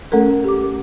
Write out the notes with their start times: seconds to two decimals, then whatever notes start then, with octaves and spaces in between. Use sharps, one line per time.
0.12 A3 C#4 A4 A#4
0.44 G4 D6